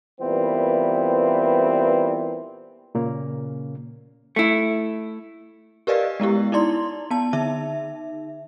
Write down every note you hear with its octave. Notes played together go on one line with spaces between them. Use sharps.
A#2 E3 G3 B3 C4
A#2 C#3 A#3 C#4
A3 E4
G4 A#4 B4 D5 D#5 F5
G#3 B3 E4 G4
D#4 E4 D5 C6
B3 A5
D3 D#4 E5